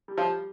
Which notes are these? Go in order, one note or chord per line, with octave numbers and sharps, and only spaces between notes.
G3
F3 F4
G3